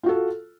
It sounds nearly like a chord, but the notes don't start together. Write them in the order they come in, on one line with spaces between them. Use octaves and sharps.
F4 F#4 A4